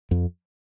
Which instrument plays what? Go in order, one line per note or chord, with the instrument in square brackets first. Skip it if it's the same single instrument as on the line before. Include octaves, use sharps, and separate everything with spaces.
[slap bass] F2